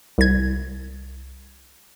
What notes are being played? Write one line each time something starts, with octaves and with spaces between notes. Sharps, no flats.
C2 G#6